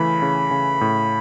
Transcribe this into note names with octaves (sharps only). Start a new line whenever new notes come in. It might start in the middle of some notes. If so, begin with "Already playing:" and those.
Already playing: C#3 E3 A3 B5
C#3
C#3
A2